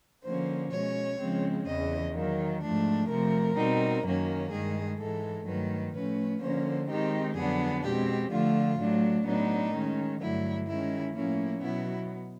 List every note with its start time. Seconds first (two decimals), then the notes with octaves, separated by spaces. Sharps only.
0.25 D3 F3 A#3 C#4 C5
0.72 B2 G#3 C#4 C#5
1.20 C#3 F3 G#3 C4
1.67 E2 C#3 E3 D#5
2.15 D#3 F#3 A#3
2.62 G#2 F3 A3 D4
3.09 C3 F3 A3 A#4
3.57 B2 G3 C4 D#4
4.05 F#2 D#3 F#3 A#3 C#4
4.51 G2 D#3 G#3 G#4
4.99 G#2 E3 G#3 A4
5.46 G2 D#3 F#3 A3 B4
5.93 A2 F3 A3 C#4 B4
6.41 D3 F3 A#3 C#4 C5
6.89 D#3 G#3 C4 D#4 G4
7.36 F2 D3 F#3 B3 D4 G#4
7.84 B2 G#3 C4 G4
8.31 D3 F3 A3 F4
8.79 A2 F#3 A3 D4
9.26 A2 F#3 B3 D4 D#4
9.73 D#3 G#3 C#4
10.21 G2 D3 F#3 A3 E4
10.68 D#3 G#3 C#4 E4
11.16 A2 F3 A#3 C#4 E4
11.63 B2 F#3 B3 E4